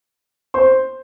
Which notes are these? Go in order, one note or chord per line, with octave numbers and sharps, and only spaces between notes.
C5 C6